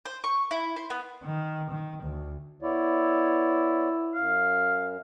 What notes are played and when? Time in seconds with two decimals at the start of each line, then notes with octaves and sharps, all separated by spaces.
0.05 C5
0.24 C#6
0.51 E4
0.76 C5
0.90 B3
1.23 D#3
1.70 D#3
2.03 D2
2.62 B3 E4 C#5 D5
4.14 F#2 F5